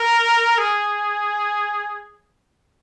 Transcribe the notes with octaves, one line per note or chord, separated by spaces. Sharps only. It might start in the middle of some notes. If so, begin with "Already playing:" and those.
Already playing: A#4
G#4